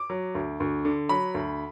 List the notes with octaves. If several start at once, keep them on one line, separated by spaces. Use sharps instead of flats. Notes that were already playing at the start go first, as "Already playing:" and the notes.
Already playing: D6
F#3
D2
D2
D3
F#3 B5
D2